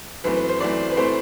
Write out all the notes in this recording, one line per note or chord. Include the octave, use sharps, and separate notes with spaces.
F#2 E3 A3 C4 B4
B4
C5
F#2 E3 A3 C4 D5
B4
E3 A3 C4 C5